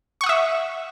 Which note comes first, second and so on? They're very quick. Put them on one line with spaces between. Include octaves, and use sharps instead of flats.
C#6 F#5 D#6 E5